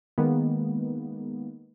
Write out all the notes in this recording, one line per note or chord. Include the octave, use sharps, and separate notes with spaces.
D#3 G#3 A#3 B3